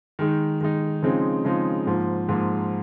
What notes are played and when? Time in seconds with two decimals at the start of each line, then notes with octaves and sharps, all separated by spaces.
0.19 D#3 G#3 D#4
0.61 D#3 G#3 D#4
1.03 C#3 F3 G#3 C4 D#4
1.45 C#3 F3 G#3 C4 D#4
1.87 G#2 F3 A#3
2.29 G#2 F3 A#3